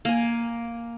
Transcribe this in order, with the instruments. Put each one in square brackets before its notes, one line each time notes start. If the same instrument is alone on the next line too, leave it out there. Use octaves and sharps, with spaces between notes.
[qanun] A#3 G#5